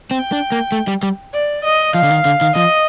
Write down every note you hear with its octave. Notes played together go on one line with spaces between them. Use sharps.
C4 G5
D4
A#3
A3
G3
G3
D5
D#5
F3 F5
D3
D#3
D3
D#3
F3 D#5